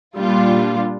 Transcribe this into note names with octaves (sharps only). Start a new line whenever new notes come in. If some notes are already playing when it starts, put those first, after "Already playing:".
A#2 G3 D4 F4